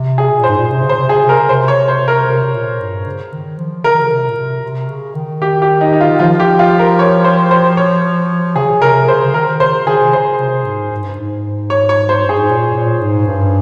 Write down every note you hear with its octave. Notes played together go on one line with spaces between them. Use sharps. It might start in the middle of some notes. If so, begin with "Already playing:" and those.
Already playing: C3
G#4
C3
A#2
C5
G#2
A#2
C3
C#3
C5
C3
C#3 G#4
C3
A#4
C#3
C3 C5
C#5
C5
A#4
C3
C3
A#2
G2
C#3
D#3
F3
C#3 A#4
D#3
C#3
C3
A#2
C3
C3
C#3
D#3
G4
G4
D#4
D#4
F4
D#3
F3 F4
G4
F4
A#4
C#5
C5
C5
C#5
C#3 G#4
C#3
C3 A#4
C#3 C5
C#3
D#3 A#4
C#3 C5
D#3 G#4
C3
C#3 C5
C3
G#2
G#2
G2
G#2
C#5
C#5
C5
G2 G#4
G#2
A#2
A#2
G#2
G2